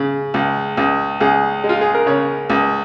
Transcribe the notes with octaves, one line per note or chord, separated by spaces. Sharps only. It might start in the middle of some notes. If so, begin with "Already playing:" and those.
Already playing: C#3
C#2
C#2
C#2 G#4
G#3
F4
G#4
A#4
C#3 C#5
C#2